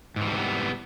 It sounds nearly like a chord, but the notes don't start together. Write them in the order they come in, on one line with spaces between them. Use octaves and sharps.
G#2 E3 G3 C3 B3